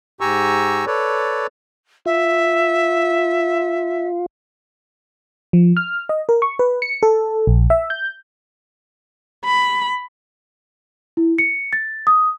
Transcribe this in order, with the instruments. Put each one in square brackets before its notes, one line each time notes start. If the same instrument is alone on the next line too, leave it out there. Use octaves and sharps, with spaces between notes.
[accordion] G#2 G4 G#5 A#5 C#6 E6
A4 B4 C#5 D5
[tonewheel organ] F4 [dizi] E5
[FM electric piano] F3
F6
D#5
A#4
C#6
B4
C#7
A4
A#1
E5
G6
[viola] B5
[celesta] E4
C#7
A6
D#6